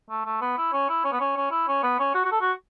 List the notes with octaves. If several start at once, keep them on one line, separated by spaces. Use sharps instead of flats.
A3
A3
B3
E4
C#4
E4
C#4
B3
C#4
C#4
E4
C#4
B3
C#4
F#4
F#4
A4
F#4